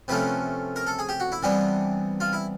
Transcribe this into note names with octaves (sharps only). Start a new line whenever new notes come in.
C3 F3 A3 C#4 B4
A#4
A4
G#4
G4
F#4
E4
C3 E3 G3 B3 D4
F4
E4